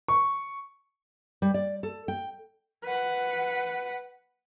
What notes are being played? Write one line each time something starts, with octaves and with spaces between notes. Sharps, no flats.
C#6
G3
D5
A4
G5
B4 F#5